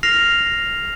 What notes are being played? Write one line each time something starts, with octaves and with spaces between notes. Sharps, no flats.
F6 A#6 C7 F7